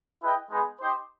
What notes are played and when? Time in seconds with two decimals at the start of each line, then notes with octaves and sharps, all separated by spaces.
0.21 E4 G#4 B4 D#5 G5
0.50 G#3 B3 D#4 G#4
0.80 D#4 G4 C5